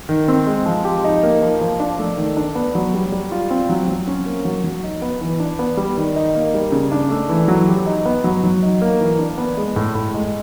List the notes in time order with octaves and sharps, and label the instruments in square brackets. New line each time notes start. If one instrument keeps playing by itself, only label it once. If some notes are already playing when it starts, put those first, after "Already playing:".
[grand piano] D#3
C4
G#3
F3
G4
D#4
A#3
F3
F3
D4
A3
D#3
D4
B3
F#3
G3
G3
F4
C4
F#3
F#3
C#4
A#3
F#3
F#3
D#4
B3
E3
D4
B3
G3
D#3
D#4
A#3
G3
C#3
D4
A3
E3
F#3
G4
D#4
B3
F#3
F#3
D#4
A#3
E3
D4
B3
G#3
A2
A2
G#3